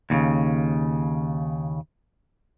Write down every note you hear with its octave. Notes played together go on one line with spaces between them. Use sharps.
D#2 A#2 C#3